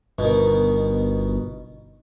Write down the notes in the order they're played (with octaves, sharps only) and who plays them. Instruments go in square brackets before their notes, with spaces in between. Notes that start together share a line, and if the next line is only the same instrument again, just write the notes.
[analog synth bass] G1 [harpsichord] B2 D#3